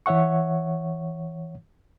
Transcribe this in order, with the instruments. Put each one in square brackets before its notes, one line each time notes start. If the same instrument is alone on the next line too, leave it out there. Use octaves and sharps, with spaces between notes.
[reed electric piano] E3 C#5 E5 F#5 C#6